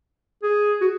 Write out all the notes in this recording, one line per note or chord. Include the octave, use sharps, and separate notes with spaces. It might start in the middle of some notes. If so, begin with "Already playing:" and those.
G#4
F#4